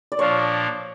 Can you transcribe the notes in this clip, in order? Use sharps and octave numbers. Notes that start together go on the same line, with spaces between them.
D5
A#2 F3 A#3 D4 C#5